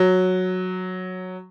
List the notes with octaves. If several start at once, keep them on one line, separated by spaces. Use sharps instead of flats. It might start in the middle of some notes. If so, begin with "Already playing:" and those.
Already playing: F#3